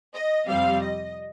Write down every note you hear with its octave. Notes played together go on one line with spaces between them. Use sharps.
D#5
F2 C3 G3 C4 F5
D#5